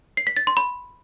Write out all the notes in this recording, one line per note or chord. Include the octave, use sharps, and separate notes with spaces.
C7
B6
A6
C6
B5